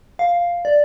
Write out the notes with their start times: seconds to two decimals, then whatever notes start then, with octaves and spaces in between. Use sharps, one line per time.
0.19 F5
0.65 D5